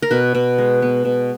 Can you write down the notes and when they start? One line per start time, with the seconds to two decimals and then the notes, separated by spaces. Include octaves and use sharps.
0.02 A#4
0.11 B2 B4
0.35 B2
0.58 G#3
0.82 B3
1.05 B2